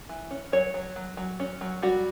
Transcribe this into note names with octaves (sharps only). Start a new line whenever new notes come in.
E3
C#4
F#3 C#5
F#3
F#3
F#3
C#4
F#3
G3 F#4